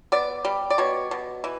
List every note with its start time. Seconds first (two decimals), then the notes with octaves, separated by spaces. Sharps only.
0.12 B3 D5
0.45 G3
0.70 D5
0.78 B2 C#5
1.11 B2
1.44 E3